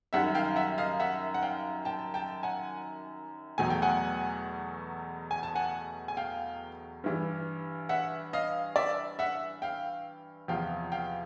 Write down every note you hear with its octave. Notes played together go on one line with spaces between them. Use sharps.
F#2 D#3 G3 E5 F#5
F5 G5
E5 F#5
D#5 F5
E5 F#5
F#5
F5 G5
G5 A5
G5 A5
F#5 G#5
E2 B2 F#3 A3 G#5
G5
F#5 G#5
G#5
A5
F#5 G#5
G#5
F5 G5
G2 E3 G3
E5 F#5
D#5 F5
D5 E5
E5 F#5
F5 G5
E2 C3 F3 F5 G5
F5 G5